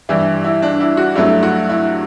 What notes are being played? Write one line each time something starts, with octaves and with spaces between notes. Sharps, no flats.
G2 E3 G3 E4
E4
D4
E4
F#4
G2 F#3 A3 E4
F#4
E4